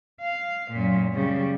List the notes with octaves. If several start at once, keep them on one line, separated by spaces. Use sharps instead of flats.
F5
F#2 A#2
C#3 G3